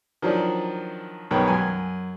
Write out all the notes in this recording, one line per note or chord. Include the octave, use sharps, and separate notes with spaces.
D#3 F3 F#3 D4
B1 D#3 G3 B3 C#5 G5
F#2 G#5